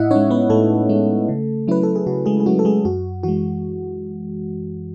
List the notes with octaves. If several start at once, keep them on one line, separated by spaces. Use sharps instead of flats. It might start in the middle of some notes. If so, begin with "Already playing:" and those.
Already playing: A2 E4 D#5 E5 F#5
G#3 C#4 D#4 C#5
B3 B4
A2 A3 A4
G#3 D#4
C#3
F#3 C#4 E4 B4
A4
G#4
C#3 F#4
G#3 G#4
G#4
F#3 C#4 E4 F#4
A4
G#3 G#4
F#2 F#4
E3 G#3 F#4